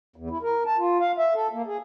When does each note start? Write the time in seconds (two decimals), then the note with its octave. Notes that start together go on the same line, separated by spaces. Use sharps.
0.16 E2
0.30 E4
0.42 A#4
0.66 A5
0.78 F4
1.00 F5
1.18 E5
1.35 A4
1.53 A#3
1.66 G#4